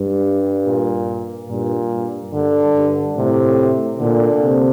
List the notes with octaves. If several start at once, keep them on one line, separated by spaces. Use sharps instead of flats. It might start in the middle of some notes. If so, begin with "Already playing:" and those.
Already playing: G2
A#2
G2 A#2
G2
G2 D3
G2
A2 C3
A#2 D3
C3